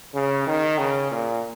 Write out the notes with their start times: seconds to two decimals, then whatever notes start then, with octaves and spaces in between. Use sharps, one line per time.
0.14 C#3
0.47 D#3
0.78 C#3
1.11 A#2